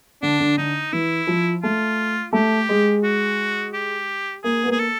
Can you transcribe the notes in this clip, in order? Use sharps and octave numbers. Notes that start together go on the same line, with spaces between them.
D3 D4
D3
D3 D#4
E3 E4
F3
A3 F4
A3 G4
G#3
F#4
G4
A#3 G#4
B3
A#3 G#4
A4